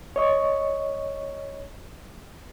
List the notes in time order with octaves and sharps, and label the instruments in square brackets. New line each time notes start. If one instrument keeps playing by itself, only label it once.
[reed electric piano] C#5 D#5 C#6